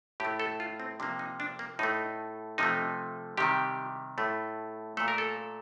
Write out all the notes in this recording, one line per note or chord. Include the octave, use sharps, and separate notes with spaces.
A2 A3 G4
A4
F4
C4
C3 F3 A#3 D4
D#4
D4
A#3
A2 A3 D#4
C3 F3 A3 D#4
C3 D#3 G3 G4
A2 A3
A#2 A3 A4
A#4
A4